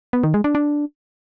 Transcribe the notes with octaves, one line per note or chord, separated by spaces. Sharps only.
B3
D#3
G#3
D4
D4